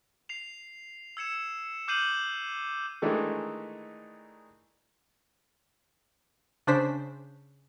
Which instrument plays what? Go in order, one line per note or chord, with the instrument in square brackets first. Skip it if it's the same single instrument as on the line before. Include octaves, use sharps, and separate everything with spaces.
[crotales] C7 F7
E6 G#6 C#7 E7
D6 F6 G6 C7 D#7 F#7
[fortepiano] D#3 E3 G#3 A3 D4 D#4
[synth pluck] C#3 D4 C5 B6